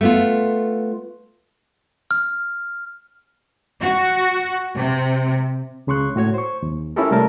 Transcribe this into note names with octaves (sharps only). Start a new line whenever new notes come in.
A3 B3 F4
F6
F#4
C3
C#2 C#3 C6 C#6 F#6
A2 F#4 C#5 G#6
C5 C#6
D#2
C#4 E4 F4 G4 A4 A#4
C3 G3 A3 A#4 A5